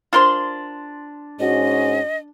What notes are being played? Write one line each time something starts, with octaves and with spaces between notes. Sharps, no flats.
D4 F4 A#4 C5 C6
G#2 C#4 F#4 D#5